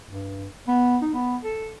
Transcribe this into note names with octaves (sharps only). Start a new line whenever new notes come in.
G2
B3
D#4
B3
A4